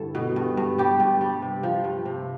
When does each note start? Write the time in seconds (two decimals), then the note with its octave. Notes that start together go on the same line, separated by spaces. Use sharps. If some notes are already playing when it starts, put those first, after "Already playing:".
Already playing: G2 D3 E4 A4
0.15 B2
0.36 G2
0.57 G2
0.78 G3 G4
1.00 G2
1.21 G3
1.42 C3
1.63 F3
1.84 G2
2.05 C3